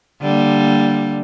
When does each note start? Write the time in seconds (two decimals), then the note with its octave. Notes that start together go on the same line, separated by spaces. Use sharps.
0.21 D3 G3 A#3